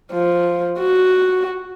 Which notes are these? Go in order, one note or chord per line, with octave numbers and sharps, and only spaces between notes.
F3
F#4